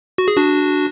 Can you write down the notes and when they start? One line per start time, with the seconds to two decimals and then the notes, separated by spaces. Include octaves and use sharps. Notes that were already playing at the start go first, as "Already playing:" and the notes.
0.18 F#4
0.28 G#4
0.37 D4 F#4